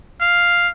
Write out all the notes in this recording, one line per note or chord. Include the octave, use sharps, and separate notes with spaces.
F5